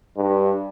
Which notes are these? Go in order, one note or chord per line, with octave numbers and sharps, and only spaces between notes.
G2